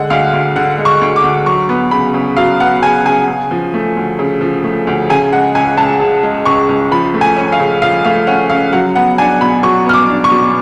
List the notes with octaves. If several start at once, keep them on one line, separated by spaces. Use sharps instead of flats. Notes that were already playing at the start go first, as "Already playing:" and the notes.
Already playing: D3 G#3 F#5
D2 F5
D2
D3 F#5
G#3
C#6
D2
D6
D2
F#3 C#6
B3
C#3 B5
C#3
F#3 F5
B3 F#5
C#3 G#5
C#3 G#5
C#3
F3
A3
D2
C#3
F3
A3
D2
C#3 G#5
G#3 F#5
C#2 G#5
C#2 A5
C#3
G#3
C#2 C#6
C#2
F3 B5
A3
G#5
C#4
F5
C#3
F3 F5
A3 F5
C#4 F#5
C#3 F5
F#3 F#5
B3 F#5
D4 G#5
B2 B5
F#3 C#6
B3 F6
D6
D4
C#6
B2